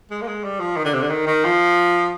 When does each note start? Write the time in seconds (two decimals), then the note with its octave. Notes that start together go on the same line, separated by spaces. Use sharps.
0.10 G#3
0.22 A#3
0.27 G#3
0.44 G3
0.60 F3
0.76 D#3
0.85 D3
0.94 C3
1.02 D3
1.10 D#3
1.27 D#3
1.44 F3